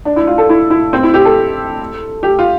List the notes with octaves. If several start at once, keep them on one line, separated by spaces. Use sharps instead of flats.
D4
E4
F4
A4
E4
E4
C4
E4
G4
A4
G4
F4